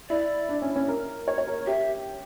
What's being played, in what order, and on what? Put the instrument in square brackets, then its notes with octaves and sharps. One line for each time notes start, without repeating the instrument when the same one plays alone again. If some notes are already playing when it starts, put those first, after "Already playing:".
[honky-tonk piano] E4 [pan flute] D5
[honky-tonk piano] D4
C#4
C#4
A#4
C#5
C#5
A#4
[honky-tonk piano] G4 [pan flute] E5